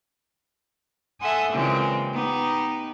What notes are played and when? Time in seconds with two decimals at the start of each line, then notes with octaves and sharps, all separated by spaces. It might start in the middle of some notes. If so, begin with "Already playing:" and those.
1.20 A4 E5 F#5 G#5 C6 D#6
1.53 A#2 C#3 E3 G#3 C4 G4
2.14 B3 D#4 G4